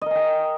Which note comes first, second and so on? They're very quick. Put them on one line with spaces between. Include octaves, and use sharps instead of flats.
D#5 A#4 G#5 G5